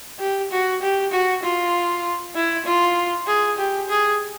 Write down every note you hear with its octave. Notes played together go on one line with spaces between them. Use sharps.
G4
F#4
G4
F#4
F4
E4
F4
G#4
G4
G#4